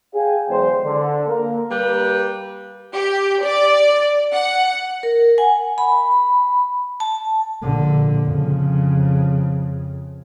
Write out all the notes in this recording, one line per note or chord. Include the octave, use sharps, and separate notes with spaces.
G#4 C#5 F5 G5 G#5
E2 D3 F#3 G#3 C5
D3
A#3 A#4
G3 A#3 G4 B4
G4
D5
F#5
A#4
F#5 G#5
B5
A5
A#1 D3
F2 C#3